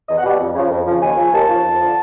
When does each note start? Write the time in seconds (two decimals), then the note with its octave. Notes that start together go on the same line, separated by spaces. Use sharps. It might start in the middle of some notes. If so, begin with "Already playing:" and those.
0.08 E2 D#5
0.18 F#5
0.23 B2 G3
0.39 F2
0.55 C#3 F3
0.70 F2
0.86 C#3 F3
1.02 D#2 G#5
1.17 C#3 F3
1.33 D#2 A5
1.48 C#3 F3
1.64 F2
1.80 D3 F3